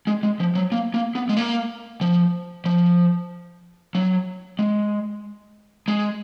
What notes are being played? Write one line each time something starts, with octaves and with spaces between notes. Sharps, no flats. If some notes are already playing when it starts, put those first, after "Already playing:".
G#3
G#3
F3
F#3
A#3
A#3
B3
G#3
A#3
F3
F3
F#3
G#3
G#3